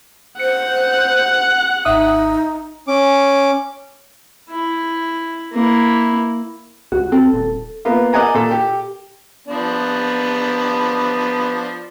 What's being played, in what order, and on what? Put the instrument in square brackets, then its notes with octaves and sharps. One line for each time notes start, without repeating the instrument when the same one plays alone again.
[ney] C5 [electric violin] F#5 [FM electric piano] C#7
[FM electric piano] G#1 E5 D#6 [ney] D#4
[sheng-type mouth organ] C#4 D6
[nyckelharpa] E4
A#3 E4
[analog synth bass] C#2 [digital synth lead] F#4
[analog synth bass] C4 [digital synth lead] A4
[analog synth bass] D#1
[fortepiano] A#3 B3 F4
A#4 D5 D#5 F#5 G#5 A#5
A#2 A4
G4
[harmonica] F3 B3 D4